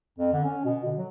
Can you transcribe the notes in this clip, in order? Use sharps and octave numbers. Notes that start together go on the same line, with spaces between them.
F2
D3
C#4
B2
D3
F#3